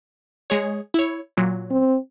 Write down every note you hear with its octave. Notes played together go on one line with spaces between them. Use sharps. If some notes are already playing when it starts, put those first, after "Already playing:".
G#3 G#4 C#5
E4 C#5
A#2 F#3
C4